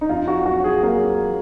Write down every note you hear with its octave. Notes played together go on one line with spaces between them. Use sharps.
D#4
F2 F4
F#4
F#3 F#4
G#4
F#3 A#3
F#3